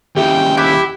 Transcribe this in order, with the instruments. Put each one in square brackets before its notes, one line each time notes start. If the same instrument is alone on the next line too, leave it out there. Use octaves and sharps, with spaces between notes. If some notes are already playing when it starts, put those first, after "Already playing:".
[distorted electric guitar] D#2 C#3 [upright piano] E4 G4 [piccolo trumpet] G5
[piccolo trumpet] E4 [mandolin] G4 [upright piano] E6 F#6